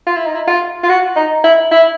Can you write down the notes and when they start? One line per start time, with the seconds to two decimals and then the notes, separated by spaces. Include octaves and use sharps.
0.06 F4
0.17 E4
0.26 D#4
0.35 E4
0.47 F4
0.83 F4
0.89 F#4
1.16 D#4
1.44 E4
1.71 E4